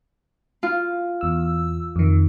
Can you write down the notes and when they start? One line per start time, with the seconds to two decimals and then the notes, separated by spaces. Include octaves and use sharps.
0.63 F4
1.21 E2 E6
1.96 F2 D#3